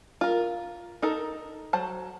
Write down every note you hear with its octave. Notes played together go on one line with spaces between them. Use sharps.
F4 A#4
D#4 A4 A#4
F#3 C5 A5